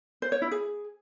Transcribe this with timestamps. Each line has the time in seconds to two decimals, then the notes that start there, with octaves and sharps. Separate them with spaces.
0.22 C5
0.32 C#5
0.42 E4
0.51 G#4